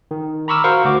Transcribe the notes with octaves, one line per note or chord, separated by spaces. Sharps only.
D#3
A#5 B5 C#6 D6 E6 F6
F#4 A#4 C5 F5 C#6
D2 F#4 D6